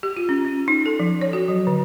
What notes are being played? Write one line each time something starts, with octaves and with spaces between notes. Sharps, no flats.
G4
F4
C#4
C#4
D#4
A4
F3
C#5
F#4
F#3
D3